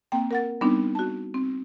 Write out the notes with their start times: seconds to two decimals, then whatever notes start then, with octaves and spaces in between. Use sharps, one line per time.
0.12 A#3 C4 G5
0.31 A#4 F#5 A6
0.61 G3 B3 C4 D4 D#4
0.95 F#4 A5
1.34 C4